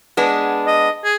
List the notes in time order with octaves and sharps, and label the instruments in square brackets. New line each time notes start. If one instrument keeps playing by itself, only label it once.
[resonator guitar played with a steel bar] G#3 B3 D4
[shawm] D#5
G#4